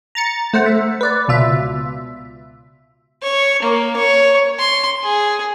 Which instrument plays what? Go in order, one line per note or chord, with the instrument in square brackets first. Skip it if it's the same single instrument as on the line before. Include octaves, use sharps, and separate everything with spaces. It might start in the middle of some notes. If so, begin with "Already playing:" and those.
[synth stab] A#5 A6 C#7
A3 C5 F#5
E5
B4 D5
C#2 B2 F4 E5
[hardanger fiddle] C#5
A#3
C#5
C6
G#4